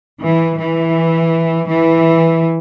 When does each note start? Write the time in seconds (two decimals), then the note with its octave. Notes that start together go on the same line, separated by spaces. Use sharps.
0.22 E3
0.58 E3
1.67 E3